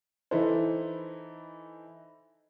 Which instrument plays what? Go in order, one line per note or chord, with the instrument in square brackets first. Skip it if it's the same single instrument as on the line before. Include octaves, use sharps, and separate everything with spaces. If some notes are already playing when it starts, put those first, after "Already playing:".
[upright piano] E3 D#4 E4 A4 C5